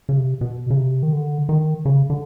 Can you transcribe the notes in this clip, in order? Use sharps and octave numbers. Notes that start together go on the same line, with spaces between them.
C#3
C3
B2
C#3
C3
D#3
D3
D#3
C#3
D3